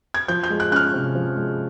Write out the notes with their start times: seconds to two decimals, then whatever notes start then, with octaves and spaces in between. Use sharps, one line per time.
0.14 G#6
0.28 F3 G6
0.43 G6
0.50 G#3
0.60 F#6
0.71 C#4 F#6
0.76 F6
0.94 C3
1.15 F3
1.36 G#3